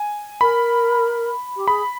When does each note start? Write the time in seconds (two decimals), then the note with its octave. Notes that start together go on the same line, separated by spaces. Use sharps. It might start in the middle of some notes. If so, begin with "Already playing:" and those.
Already playing: G#5
0.41 A#4 B5
1.56 G4
1.67 G#4 B5